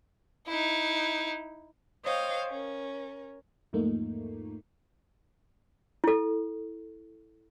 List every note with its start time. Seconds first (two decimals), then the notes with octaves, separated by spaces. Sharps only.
0.47 D#4 E4
2.04 C5 C#5 D#5 F5 G5
2.46 C#4 A#4
3.73 E2 G#2 F3 A3 A#3 D#4
6.04 E4 A4